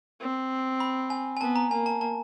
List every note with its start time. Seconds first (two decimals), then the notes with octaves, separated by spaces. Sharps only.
0.20 C4
0.80 B5
1.10 G#5
1.37 G#5
1.41 B3 A5
1.56 A#5
1.71 A#3 G#5
1.86 A5
2.01 A5